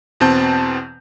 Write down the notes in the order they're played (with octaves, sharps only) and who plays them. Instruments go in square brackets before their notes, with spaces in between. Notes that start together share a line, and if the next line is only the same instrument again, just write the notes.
[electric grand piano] E2 B2 C4 A5 G6